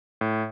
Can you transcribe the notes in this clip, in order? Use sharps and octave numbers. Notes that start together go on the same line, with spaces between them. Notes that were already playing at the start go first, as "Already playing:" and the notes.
A2